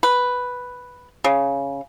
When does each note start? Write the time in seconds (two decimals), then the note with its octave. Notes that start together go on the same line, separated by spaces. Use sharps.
0.03 B4
1.24 C#3